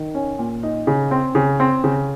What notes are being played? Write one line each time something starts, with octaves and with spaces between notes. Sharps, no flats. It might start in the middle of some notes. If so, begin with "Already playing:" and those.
Already playing: D#3
C#4
A#2
D#4
C#3
C4
C#3
C4
C#3